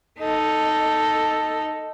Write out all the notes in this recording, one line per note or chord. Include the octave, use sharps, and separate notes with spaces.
D#4 A4